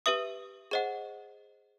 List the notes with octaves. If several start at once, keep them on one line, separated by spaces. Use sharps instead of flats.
G4 B4 E5 D#6
G#4 C5 D#5 F#5